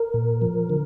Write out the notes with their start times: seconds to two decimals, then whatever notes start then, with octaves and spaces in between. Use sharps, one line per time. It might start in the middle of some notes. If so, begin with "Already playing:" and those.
Already playing: A#4
0.14 A#2
0.42 F3
0.70 D3